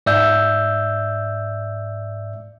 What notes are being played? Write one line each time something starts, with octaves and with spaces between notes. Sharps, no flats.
G#2 D5 E5 E6 G6